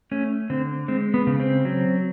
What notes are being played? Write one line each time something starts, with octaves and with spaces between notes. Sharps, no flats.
A3 C#4
D3 C4
G#3 C4
B3
C#3
C4
F#3